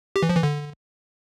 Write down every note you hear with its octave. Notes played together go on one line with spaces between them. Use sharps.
G4
E3
F3
E3
D3